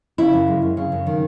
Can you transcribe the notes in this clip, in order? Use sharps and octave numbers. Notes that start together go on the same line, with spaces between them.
C#3 E4
F#2
G#3
F#2
C#3
F#2
D#3